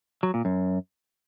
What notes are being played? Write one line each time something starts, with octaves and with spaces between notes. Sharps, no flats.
F#3
A#2
F#2